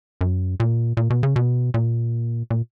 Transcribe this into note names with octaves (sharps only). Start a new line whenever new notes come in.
F#2
A#2
A#2
B2
C#3
B2
A#2
A#2